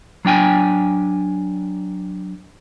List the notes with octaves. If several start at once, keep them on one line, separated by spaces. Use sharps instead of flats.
F#3 D4 G5 G#5